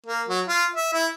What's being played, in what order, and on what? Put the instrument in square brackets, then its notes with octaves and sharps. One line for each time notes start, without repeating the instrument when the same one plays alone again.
[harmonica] A#3
F#3
F4
E5
E4